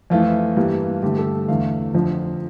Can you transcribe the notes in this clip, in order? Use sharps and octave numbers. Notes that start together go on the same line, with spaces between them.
F2 E3 A3 F4
G2 E3 G3 A#3
G2 D3 A3 G4
A4
E2 D3 A3 F5
F2 D3 F3